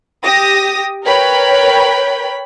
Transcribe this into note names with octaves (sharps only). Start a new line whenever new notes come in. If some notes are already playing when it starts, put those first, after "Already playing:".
G4 D#6 A#6
A#4 B4 C#5 G5 B5